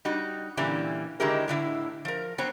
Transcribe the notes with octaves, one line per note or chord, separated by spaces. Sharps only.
G3 D#4 F#4
A#2 D3 E3 G3 C#4 E4
D3 D#3 G#3 E4 G4 A#4
A2 D3 E4
F3 A#4
F#3 B3 C4 C#5